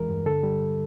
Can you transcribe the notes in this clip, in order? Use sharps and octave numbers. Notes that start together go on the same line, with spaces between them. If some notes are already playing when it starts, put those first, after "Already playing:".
Already playing: E2 E3 G#3 A#4
G2
D3 A4
G3